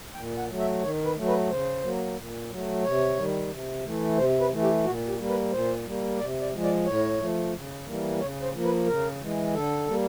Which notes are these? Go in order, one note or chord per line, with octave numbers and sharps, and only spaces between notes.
A#2 G5
F#5
F#3 A3
E5
D#3 C#5
B4
F#3 A3
B4
C#3 C5
F#3 A#3
A#2
F#3 A3
C3 C#5
D#3 G3
C3
E3 A3
C3 C5
B4
E3 A3
G4
A#2 F#4
G4
G3 A#3
B4
A#2 C5
G3 A#3
C3 D5
D5
F3 G#3
D5
A2 C#5
F3 A3
C#3
E3 G3 A#3
C#3 C#5
C5
F3 A#3
B4
C#3 A#4
E3 G#3
D3 A4
G3 A#3